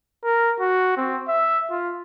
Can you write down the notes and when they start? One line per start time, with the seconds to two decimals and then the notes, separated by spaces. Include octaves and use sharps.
0.24 A#4
0.60 F#4
0.97 C4
1.28 E5
1.71 F4